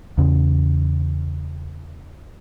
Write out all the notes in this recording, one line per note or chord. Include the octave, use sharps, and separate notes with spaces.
E2 C#3 C#4